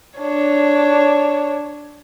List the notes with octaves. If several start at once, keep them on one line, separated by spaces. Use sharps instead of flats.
D4 C#5